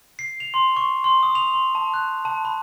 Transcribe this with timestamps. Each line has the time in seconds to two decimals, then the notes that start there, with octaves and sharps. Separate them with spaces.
0.19 C7
0.40 F7
0.54 C6
0.77 C#6
1.04 C6
1.23 D#6
1.35 F7
1.54 C6
1.75 A5
1.94 F#6
2.25 A5
2.45 B5